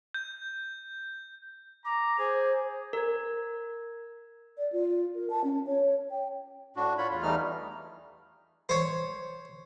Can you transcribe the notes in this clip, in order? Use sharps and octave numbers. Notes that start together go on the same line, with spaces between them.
G6
A#5 D6
G#4 C5
A#4 G#6
D5
F4
A#4
A5
C#4
C#5
G5
A2 D4 F#4
F4 C#5 B5
E2 F4
E2 E3 G3 A3 D#4 F6
C5 C#5